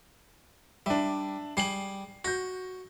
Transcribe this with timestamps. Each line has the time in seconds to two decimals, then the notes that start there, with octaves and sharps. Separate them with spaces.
0.86 G3 D4 E5
1.57 G3 G#4 C7 F#7
2.25 F#4 G6 A#6